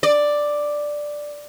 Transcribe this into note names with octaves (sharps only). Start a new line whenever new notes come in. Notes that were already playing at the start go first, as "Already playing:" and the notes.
D5